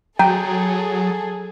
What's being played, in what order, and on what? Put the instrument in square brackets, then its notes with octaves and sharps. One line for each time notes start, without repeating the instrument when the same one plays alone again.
[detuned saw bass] F#3 [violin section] G#4 A4 [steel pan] G5 [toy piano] A#5